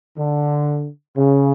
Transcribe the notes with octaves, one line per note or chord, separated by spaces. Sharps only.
D3
C#3